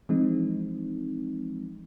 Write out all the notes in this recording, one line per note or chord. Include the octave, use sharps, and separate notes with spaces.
E3 F3 G#3 C4 D#4